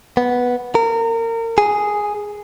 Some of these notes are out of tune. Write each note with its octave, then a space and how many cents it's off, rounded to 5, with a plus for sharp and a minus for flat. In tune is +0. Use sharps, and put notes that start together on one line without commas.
B3 -5
A#4 -30
G#4 +0